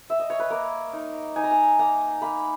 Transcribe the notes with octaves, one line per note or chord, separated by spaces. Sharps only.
E5
D#5
C#5
B4
A#3 A#4
D#4
D#4 G#5
A#5
G#5
A#3 A#5
A#3 B5